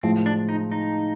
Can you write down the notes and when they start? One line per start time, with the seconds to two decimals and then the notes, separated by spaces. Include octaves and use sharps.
0.03 A2 F3 G#3 C4
0.26 D4
0.49 D#4
0.72 D#4